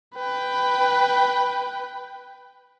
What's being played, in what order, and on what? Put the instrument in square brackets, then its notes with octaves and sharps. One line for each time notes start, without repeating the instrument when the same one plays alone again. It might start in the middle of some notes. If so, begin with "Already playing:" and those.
[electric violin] B4 G5